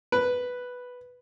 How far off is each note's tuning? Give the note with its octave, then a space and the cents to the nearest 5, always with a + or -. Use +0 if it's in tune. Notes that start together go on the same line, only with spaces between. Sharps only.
B4 +0